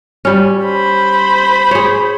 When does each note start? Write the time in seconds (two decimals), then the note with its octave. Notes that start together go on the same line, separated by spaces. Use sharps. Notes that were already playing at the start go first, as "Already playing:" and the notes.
0.25 G3 C#4
0.65 C5 B5
1.71 G#4 C#5